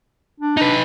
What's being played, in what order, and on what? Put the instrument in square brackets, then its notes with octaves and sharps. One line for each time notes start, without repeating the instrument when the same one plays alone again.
[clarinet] D4
[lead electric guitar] D#4 B4